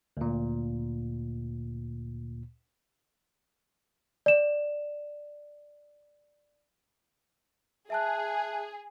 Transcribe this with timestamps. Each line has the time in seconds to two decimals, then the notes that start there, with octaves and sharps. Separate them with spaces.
0.17 D2 A#2
4.26 D5 E7
7.90 G#4 E5 A5 F#6